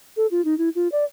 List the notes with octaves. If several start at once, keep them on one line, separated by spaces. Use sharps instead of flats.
A4
F4
D#4
E4
F4
D5